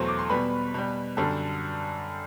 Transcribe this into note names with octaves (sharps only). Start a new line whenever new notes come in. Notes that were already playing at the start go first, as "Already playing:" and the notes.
Already playing: E2 B2 F#3 A3 C5 C6
D6
C6
B2 G3 B4 B5
B2 G3
F#2 D3 G3 A4 A5